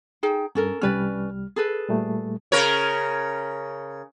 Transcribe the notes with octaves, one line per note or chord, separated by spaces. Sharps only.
D#4 G#4 G5
G2 C#4 A4 A#4
C2 G3 C#4 B4 D5 F6
G#4 A4 B4
A#2 G3 A3
C#3 A#4 C#5